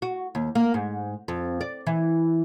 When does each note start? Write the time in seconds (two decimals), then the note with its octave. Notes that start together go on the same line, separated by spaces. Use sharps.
0.02 F#4
0.35 D#2
0.55 A#3
0.74 G#2
1.28 F2
1.61 D5
1.87 E3